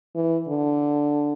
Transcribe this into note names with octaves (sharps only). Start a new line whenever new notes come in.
E3
D3